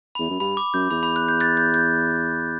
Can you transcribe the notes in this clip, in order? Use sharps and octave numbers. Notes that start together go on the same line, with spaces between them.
E2 B5
F#2
G2 B5
D6
F#2 G6
E2 B5
B5
F#6
G6
F#6 A6
G6
G6